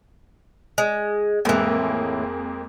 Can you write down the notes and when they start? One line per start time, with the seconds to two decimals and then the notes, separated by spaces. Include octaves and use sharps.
0.78 G#3
1.45 F2 A2 E3 G#3 A#3